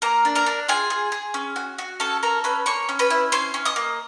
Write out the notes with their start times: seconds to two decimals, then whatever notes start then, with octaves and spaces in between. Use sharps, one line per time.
0.02 A#3 A#4 A#5
0.25 D4
0.35 A#4 A#5
0.46 D4
0.68 F4 G#4 G#5
0.90 G#4
1.12 G#4
1.34 C#4
1.56 F#4
1.78 F#4
2.00 C#4 A4 A5
2.23 A4 A#4 A#5
2.44 C#4 B4 B5
2.66 A#3 C#5 C#6
2.89 C#4
2.99 B4 B5
3.10 E4
3.32 C#4 C5 C6
3.54 C#4
3.65 D#5 D#6
3.76 A#3